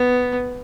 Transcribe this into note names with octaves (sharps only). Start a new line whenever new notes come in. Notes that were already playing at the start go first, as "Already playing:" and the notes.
Already playing: B3